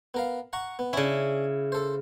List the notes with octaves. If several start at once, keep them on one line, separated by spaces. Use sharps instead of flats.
B3 A#4 F5
F#5 A#5 C#6
B3
C#3 C#4 D4 E4
A4 C5